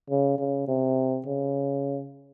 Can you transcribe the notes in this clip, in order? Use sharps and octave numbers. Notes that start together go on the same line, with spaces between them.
C#3
C#3
C3
C#3